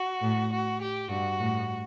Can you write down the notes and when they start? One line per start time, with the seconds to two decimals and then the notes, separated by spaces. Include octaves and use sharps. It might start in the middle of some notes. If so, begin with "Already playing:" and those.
Already playing: F#4
0.21 A2
0.52 F#4
0.81 G4
1.10 G2 F#4
1.40 A2